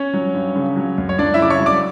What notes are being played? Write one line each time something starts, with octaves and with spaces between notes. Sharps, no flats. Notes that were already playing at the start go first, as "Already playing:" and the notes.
Already playing: C#4 C#5
F#3
G2
C#3
F#3
F#2
C#5
F#2 D4 D5
E4 E5
C#3 D6
C#5 C#6
F#3
D5 D6